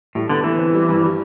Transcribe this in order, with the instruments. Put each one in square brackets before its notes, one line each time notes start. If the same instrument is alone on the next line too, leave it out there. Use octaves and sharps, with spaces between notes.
[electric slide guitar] A2 [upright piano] G3
[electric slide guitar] D3 [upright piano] B3
[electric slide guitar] E3 [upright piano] A3
[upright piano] C4
G3
G2
G3